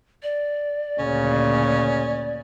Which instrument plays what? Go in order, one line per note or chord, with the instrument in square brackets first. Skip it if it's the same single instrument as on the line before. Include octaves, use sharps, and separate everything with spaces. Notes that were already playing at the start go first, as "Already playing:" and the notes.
[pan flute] D5
[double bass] D2 A#2 [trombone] C#3 [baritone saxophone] C#4